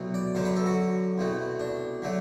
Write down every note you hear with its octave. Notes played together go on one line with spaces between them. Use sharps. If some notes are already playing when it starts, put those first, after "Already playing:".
Already playing: C2 B2 F#3 A3
D5
F#2 D3 F#3 C5
B4
A4
F#4
C2 B2 A3
D4
D3 F#3 A3